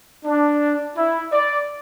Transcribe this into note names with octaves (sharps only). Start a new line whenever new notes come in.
D4
E4
D5